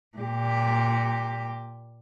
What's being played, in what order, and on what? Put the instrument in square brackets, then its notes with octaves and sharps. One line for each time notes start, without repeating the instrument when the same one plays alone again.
[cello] A#2 G4